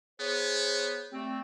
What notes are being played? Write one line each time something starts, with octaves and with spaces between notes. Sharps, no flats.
B3 G#4 C5 C#5
G3 A3 C4